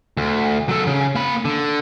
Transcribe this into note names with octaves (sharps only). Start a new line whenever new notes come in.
D2
F#3 A4
C#3
A#3 B5
D3